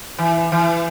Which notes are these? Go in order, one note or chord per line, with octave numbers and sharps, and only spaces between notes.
E3
E3